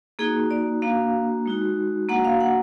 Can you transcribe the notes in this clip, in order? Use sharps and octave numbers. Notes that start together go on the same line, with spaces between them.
A#3 D#4 F#4 G#4
D5
A#3 D4 F#4 F5
G#3 D#4 F#4
A#3 D4 F#4 F#5
F5
F#5